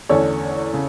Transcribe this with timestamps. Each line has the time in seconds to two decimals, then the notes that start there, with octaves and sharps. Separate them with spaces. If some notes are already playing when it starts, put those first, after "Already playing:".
0.09 E2 D3 A3 C#4 A4 C#5
0.73 C#3